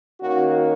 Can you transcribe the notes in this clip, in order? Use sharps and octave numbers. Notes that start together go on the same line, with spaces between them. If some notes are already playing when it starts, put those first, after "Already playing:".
D#3 A#3 C#4 F#4